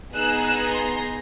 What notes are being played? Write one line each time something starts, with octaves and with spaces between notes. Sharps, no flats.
B3 D#4 G#4 E6 F#6
E6 F#6
A#5 C6